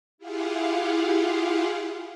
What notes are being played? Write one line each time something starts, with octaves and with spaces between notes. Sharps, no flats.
E4 F4 G4 G#4 F5 F#5